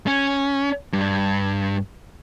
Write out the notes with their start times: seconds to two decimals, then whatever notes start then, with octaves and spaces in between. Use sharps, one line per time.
0.07 C#4
0.93 G2